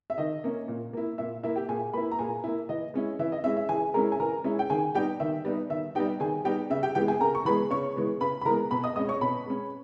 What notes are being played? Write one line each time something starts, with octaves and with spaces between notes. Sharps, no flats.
E5
D#3 D#5
A#3 C#4
A#2
A#3 E4
A#2 E5
A#3 E4 E5
G4 G5
A#2 G#4 G#5
A#3 E4 B4 B5
A#5
A#2 G#4 G#5
A#3 E4
E3 D#5
G#3 C#4 E4
E3 E5
D#5
G#3 C#4 E4 E5
E5
E3 G#4 G#5
G#3 C#4 E4 A#4 A#5
G#5
E3 A#4 A#5
G#3 C#4 E4
G5
D#3 G#4 G#5
G3 B3 D#4 G4 G5
D#3 E5
G3 B3 D#4
D#3 E5
G3 B3 D#4 G4 G5
D#3 G#4 G#5
G3 B3 D#4 G4 G5
C#3 E5
G4 G5
E3 G#3 B3 G4 G5
G#4 G#5
C#3 A#4 A#5
C#6
E3 G#3 B3 B4 B5
C#3 C#5 C#6
E3 G#3 B3
C#3 B4 B5
B5
E3 G#3 B3 A#4 A#5
B2 B4 B5
D#5 D#6
G#3 C#4 D#5 D#6
C#5 C#6
B2 B4 B5
G#3 C#4